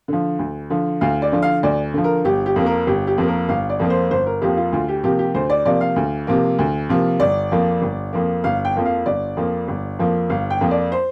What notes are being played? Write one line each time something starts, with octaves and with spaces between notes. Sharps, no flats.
D3 F3
D2
D3 F3
D2 F5
D5
D3 F3
F5
D2 D5
D3 F3
A#4
G1 G4
G4
F2 F3 A#3
A#4
G1 G4
G4
F2 F3 A#3
A#4
G1 F5
D5
F2 F3 A#3
C5
G1 C5
A#4
F2 F3 A#3 G4
F4
D2 F4
G4
C3 F3 A#3 G4
G4
D2 C5
D5
C3 F3 A#3 D5
F5
D2
C3 F3 A#3
D2
C3 F3 A#3
G1 D5
F2 F3 A#3
G1
F2 F3 A#3
G1 F5
G5
F2 F3 A#3
F5
G1 D5
F2 F3 A#3
G1
F2 F3 A#3
G1 F5
G5
F2 F3 A#3
D5
C5